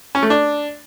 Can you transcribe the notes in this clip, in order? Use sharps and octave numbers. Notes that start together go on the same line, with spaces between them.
C#4
A3
D4